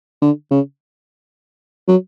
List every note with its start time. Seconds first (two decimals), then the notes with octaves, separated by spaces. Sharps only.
0.22 D3
0.51 C#3
1.88 F#3